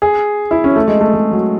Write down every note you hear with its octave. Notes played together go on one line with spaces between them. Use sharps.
G#4
E4
C#4
A3
G#3
A3
G#3
F#3